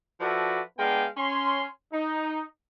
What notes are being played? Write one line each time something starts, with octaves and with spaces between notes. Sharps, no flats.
F3 F#4 A4 B4 D5 E5
G#3 B3 D4 F5 G5 G#5
C#4 C6
D#4